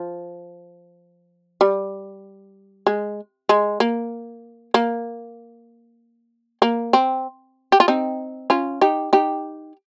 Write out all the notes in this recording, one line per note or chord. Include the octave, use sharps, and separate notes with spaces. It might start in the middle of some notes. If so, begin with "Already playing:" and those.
Already playing: F3
G3
G#3
G#3
A#3
A#3
A#3
C4
G4
F4
C4 D#4
C#4 F4
D#4 G4
D#4 G4